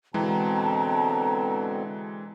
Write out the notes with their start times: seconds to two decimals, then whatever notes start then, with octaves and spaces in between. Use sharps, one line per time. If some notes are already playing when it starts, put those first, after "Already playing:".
0.14 B2 D3 E3 G#3 C4 G5 A5 A#5